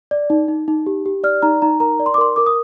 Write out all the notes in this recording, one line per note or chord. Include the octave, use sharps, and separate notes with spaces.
D5
D#4
D#4
D#4
G4
G4
D5 F6
D#4 A#5
D#4 A#5
A#4 A#5
D5
C6
D6
A#4 C6
A#4 D6
D#6